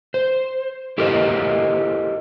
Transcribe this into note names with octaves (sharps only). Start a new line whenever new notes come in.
C5
E4 G4 A4 A#4 C5 D#5